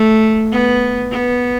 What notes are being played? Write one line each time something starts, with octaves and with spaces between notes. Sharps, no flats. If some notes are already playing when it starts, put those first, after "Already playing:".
Already playing: A3
B3
B3